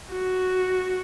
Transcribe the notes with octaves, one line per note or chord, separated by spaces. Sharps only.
F#4